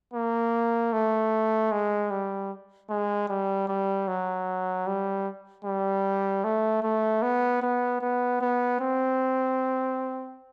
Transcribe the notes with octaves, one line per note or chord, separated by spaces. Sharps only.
A#3
A3
G#3
G3
G#3
G3
G3
F#3
G3
G3
A3
A3
B3
B3
B3
B3
C4